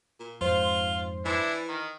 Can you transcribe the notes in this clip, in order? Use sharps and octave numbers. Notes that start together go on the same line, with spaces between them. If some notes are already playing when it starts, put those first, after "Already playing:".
A#2
F2 G#2 F4 C5 C6
E3 D4 E4
D#3